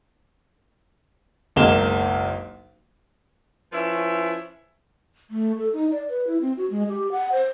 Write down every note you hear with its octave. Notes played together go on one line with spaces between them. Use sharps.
F#1 B1 G#3 A#3 E7 G7
F3 C#4 E4 B4 E5
A3
A4
D#4
D5
B4
E4
C4
F#4
G#3
G4
F#5
C5